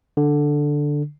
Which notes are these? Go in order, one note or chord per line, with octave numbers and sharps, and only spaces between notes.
D3